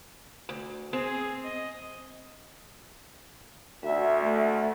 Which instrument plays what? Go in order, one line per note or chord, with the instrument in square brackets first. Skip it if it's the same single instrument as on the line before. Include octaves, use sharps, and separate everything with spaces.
[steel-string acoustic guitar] D2
[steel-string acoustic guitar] C4 [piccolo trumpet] G#4
[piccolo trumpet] D#5
[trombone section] D2 [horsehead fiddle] E5
[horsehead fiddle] A3